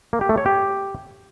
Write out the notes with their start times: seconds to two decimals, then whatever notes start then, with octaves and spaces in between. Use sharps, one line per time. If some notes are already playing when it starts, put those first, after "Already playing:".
0.13 A#3
0.21 G4
0.29 A3
0.38 C#5
0.46 G4